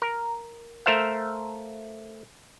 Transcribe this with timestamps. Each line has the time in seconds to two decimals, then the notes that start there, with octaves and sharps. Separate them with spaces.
0.02 A#4
0.86 A3 A#4 C5 E5 F5